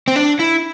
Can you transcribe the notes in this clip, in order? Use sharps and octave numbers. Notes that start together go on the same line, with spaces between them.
C4
D4
E4